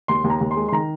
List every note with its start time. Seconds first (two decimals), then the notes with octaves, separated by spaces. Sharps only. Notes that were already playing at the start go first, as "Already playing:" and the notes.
0.08 D#2 C6
0.24 D#2
0.30 A#5
0.41 D#2
0.51 C6
0.56 G#3
0.68 C6
0.72 D#3 A#5